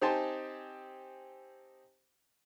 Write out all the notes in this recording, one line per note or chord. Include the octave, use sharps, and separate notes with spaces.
C4 D#4 G4 G#5 A5 C6